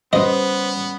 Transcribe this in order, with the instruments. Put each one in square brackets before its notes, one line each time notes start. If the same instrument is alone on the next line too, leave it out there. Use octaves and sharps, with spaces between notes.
[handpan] G3 C#4 [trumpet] B3 [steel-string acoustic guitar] B4 C5 [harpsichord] D#5